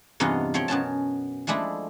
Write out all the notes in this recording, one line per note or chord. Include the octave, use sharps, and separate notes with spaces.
E2 G2 C3 D#4 F4 F#5
F3 C4 C#5 G5
F#2 B2 C#4 A5
F3 G#3 A3 D4 E4